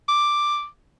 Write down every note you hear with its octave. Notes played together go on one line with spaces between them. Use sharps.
D6